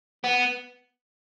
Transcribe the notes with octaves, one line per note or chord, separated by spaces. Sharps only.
B3